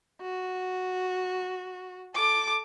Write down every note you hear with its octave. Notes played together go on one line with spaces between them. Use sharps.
F#4
A4 D6